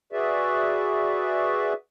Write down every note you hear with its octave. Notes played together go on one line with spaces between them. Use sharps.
F#4 G#4 B4 D5 E5